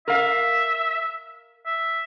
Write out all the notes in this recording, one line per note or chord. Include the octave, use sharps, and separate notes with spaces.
A#4 E5 F5
E5